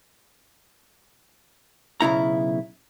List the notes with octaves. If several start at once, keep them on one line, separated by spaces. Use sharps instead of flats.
B1 C#3 E4 A#5